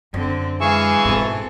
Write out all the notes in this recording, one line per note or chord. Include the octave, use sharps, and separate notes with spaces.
F#2 D3 C4
E3 G#3 G#4 F5 C#6 E6
G#2 B2 C4 A4